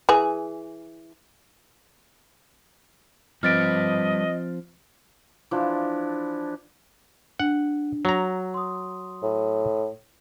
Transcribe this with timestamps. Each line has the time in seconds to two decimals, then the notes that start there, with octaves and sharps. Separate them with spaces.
0.09 E3 G#4
3.43 F3 G3 C4 B4 D#5 F6 A6 D7
5.51 E3 F3 D4
7.40 D4 F#5
8.05 F#3 A#5
8.54 C6 D#6
9.22 A2